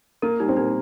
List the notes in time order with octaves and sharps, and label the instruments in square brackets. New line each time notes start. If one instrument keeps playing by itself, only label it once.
[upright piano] A#3 [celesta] A#4
[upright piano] G3 [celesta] D#4
[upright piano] C4
[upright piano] A#3 [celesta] D#4